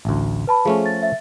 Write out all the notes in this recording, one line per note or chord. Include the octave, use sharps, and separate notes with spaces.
A1 D2
B4 A5 B5
F3 A3 C#4 G#4
A6
E5 A6